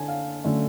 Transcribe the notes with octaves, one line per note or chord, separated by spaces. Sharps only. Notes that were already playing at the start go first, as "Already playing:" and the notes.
Already playing: D3 G#5 A5
F5
D3 F#3 A3 C#4